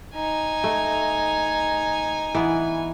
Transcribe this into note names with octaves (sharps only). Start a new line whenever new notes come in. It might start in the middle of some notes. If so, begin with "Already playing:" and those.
D#4 G#5
A3
E3 B3